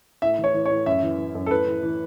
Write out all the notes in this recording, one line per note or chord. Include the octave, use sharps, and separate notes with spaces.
A2 E5
E3
C#5
E3
C#5
A2
F#2 E5
E3
E3
F#2
A4
A2 B4
E3
E3